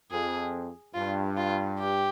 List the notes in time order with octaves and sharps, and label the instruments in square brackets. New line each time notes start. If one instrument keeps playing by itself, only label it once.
[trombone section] F2 [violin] G#4
[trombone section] G2 [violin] F4
[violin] F4
G4